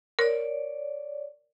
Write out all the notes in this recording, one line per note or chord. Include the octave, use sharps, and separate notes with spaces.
A#4 C#5 D5